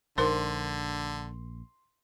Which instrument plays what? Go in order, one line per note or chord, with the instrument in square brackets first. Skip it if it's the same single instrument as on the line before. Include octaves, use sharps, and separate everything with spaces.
[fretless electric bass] A#1 [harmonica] D3 [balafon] D#4 A#4 C5 [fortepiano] C6